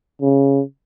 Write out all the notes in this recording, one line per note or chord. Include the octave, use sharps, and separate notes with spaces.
C#3